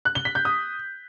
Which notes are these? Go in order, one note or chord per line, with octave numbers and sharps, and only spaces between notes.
F#6
G7
B6
G6
D#6